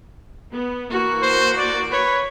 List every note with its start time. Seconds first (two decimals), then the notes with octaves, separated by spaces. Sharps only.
0.53 B3
0.90 E3 A#3 F#4
1.22 C5
1.58 D5
1.92 B4 C#5